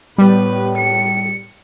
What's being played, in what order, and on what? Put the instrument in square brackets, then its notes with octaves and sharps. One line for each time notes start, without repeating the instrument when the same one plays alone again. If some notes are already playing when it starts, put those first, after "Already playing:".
[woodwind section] A2 [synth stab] G3 [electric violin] B3 B4
[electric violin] C#7